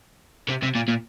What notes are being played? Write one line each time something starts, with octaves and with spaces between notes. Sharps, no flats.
C3
C3
A#2
A#2